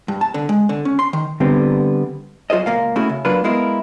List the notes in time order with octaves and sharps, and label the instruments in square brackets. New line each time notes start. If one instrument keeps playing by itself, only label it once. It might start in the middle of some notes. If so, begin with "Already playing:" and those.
[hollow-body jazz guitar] G2
A5
D3
G#3
D3
C#4
C6
D#3
D3 G3 B3 C4
F#3 F4 G#4 C5 D#5
C#2 A#2 A#3 F5
A3 C#4 E4 F#4 G#4
C#3
F#3 A#3 D4 F4 A#4 B4
G#3 B3 E4 F4 A#4